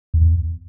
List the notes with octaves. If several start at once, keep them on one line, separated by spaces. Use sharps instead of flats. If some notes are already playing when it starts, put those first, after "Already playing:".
E2